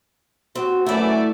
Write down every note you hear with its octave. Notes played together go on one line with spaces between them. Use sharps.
C4 F#4
F#2 E3 A3 E4 D5 E5